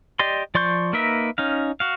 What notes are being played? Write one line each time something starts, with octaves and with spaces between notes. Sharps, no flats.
G4 D5 D#5 C6
F3 D5 C6 C#6 G6
A#3 D#4 A#4 B4 E5
C#4 D#4 F5
F#4 F5